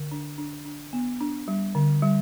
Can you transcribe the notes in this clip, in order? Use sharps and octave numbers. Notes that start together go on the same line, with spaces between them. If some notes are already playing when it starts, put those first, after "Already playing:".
Already playing: D3
D4
D4
D4
B3
D4
G3
D3
G3